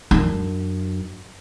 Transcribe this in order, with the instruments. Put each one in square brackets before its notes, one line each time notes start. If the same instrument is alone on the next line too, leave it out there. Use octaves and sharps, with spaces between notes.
[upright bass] F#2 D4